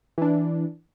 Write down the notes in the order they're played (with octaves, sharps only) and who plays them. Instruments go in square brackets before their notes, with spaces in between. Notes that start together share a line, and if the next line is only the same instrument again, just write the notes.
[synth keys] E3 D4